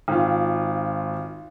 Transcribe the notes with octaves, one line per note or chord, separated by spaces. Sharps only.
G#1 F4